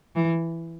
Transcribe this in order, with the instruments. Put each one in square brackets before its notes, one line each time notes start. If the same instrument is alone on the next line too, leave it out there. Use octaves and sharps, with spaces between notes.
[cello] E3